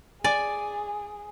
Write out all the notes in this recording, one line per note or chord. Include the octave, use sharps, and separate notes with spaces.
G#4 D5 G#5